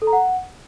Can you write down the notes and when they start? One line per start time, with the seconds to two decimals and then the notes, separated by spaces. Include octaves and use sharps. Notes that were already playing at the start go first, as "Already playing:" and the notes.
0.02 A4
0.07 A#5
0.13 F#5